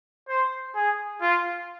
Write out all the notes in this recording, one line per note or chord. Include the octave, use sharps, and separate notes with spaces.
C5
G#4
F4